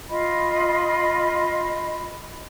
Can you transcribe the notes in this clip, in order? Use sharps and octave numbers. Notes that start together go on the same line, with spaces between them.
F4 D#5 B5